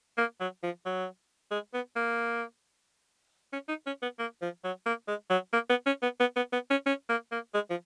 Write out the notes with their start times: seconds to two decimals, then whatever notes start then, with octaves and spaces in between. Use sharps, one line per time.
0.18 A#3
0.40 F#3
0.63 F3
0.85 F#3
1.51 G#3
1.74 B3
1.96 A#3
3.53 C#4
3.69 D#4
3.86 C#4
4.02 B3
4.19 A#3
4.42 F3
4.64 F#3
4.86 A#3
5.08 G#3
5.30 F#3
5.53 A#3
5.70 B3
5.86 C#4
6.02 B3
6.20 B3
6.36 B3
6.53 B3
6.70 C#4
6.86 C#4
7.09 A#3
7.32 A#3
7.54 G#3
7.70 F3